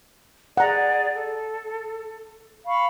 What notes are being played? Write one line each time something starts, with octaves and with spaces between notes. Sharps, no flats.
G#4 D5 F#5 A#5
A4
F5 B5 C#6